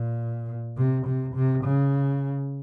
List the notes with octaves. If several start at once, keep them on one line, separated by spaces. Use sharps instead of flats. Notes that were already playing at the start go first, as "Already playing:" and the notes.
Already playing: A#2
C3
C3
C3
C#3